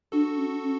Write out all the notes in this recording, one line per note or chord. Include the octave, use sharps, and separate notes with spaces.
D4 F#4 A4
C#4
C#4